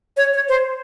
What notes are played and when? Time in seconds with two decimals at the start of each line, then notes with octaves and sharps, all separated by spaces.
0.17 C#5
0.33 C#5
0.48 C5